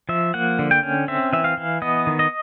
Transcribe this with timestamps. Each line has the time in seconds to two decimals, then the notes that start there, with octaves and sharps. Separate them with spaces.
0.09 F3 E5
0.34 A#3 F#5
0.59 D3
0.71 G5
0.83 C#4
1.08 C4 E5
1.33 E3 E5
1.44 F5
1.58 E3
1.82 B3 D#5
2.07 D#3
2.19 D#5